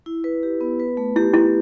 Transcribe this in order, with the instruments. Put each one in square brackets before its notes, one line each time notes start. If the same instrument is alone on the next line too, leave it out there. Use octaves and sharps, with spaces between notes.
[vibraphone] E4
B4
G4
B3
B4
A3
[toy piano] E4 [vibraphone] G4
[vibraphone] A3 [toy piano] E4